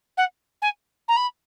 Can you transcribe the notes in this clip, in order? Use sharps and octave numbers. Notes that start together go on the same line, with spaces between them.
F#5
G#5
A#5
B5